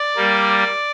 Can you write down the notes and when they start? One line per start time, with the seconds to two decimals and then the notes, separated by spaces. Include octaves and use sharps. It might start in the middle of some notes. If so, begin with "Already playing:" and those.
Already playing: D5
0.16 G3 A#3